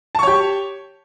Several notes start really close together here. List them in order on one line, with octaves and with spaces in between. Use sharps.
A5 C#6 C#5 G4